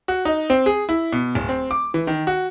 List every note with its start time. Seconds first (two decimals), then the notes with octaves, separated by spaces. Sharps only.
0.08 F#4
0.25 D#4
0.50 C4
0.66 G#4
0.89 E4
1.13 B2
1.35 D1
1.49 C4
1.71 D6
1.94 E3
2.07 D#3
2.27 F#4